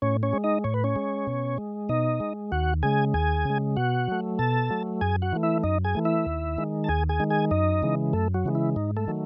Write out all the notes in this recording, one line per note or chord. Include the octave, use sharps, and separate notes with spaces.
A2 C#4 C#5
C#4 C#5
G#3
D#4 D#5
A2 C#5
B4
C#4 C#5
G#3
B2
G#3
B2 D#4 D#5
G#3
D#2 F#4 F#5
C#3 G#3 G#4 G#5
D#2 G#4 G#5
C#3 G#3
B2 F#4 F#5
F#3 A3
B2 A4 A5
F#3 A3
F#2 G#4 G#5
F#4 F#5
E3 A3
E4 E5
F#2 D#4 D#5
G#4 G#5
E3 A3
E4 E5
D#2
D#3 G#3
A5
D#2 G#4 G#5
G#4 G#5
D#3 G#3
G#4 G#5
F#2 D#4 D#5
C#3 E3 G#3
F#2 A3 A4
F#3 F#4
C#3 E3 G#3
E4
G#2 D#4
A3 A4
D#3 F#3 A3